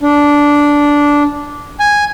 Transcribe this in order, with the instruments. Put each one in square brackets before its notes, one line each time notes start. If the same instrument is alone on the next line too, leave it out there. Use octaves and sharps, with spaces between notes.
[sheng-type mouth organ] D4
G#5